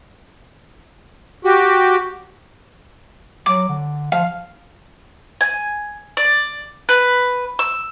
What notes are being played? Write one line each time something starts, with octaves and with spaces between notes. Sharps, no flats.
F#4 G4
F#3 D6
D3
F3 F5
G#5
D5
B4
E6